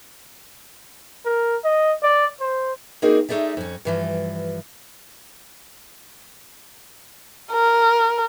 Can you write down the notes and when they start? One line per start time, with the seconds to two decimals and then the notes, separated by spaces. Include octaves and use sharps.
1.25 A#4
1.64 D#5
2.03 D5
2.40 C5
3.02 A#3 C4 D4 D#4 F#4 G#4
3.29 A3 D#4 G#4 D5 E5
3.57 F2 C#4
3.85 G2 E3 F3
7.52 A#4